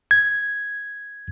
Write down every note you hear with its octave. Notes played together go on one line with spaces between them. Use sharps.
G#6